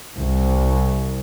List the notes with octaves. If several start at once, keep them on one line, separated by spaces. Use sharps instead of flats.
C2